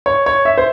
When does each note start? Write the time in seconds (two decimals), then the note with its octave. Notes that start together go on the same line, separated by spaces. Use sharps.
0.06 C#5
0.26 C#5
0.45 E5
0.58 C5